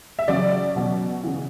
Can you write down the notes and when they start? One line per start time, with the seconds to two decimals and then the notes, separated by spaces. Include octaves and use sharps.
0.19 E5
0.28 C#3 F#3 D5
0.76 B2 F#3
1.23 C#3 E3